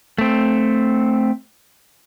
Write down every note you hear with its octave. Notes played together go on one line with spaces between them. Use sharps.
A3 C4